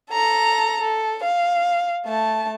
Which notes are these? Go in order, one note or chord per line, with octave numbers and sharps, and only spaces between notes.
A4 A#5
A4
F5
A3 A5